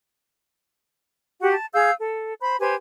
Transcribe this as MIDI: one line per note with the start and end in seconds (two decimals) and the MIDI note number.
1.40 1.53 66
1.40 1.53 67
1.40 1.53 78
1.53 1.67 81
1.74 1.91 68
1.74 1.91 77
1.74 1.91 88
1.74 1.91 91
2.00 2.33 69
2.41 2.56 72
2.41 2.56 83
2.60 2.75 67
2.60 2.75 71
2.60 2.75 72
2.60 2.75 80